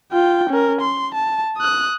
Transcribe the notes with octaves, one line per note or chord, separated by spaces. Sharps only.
F4 G5
C#4 A#4
C6
A5
D#6 F#6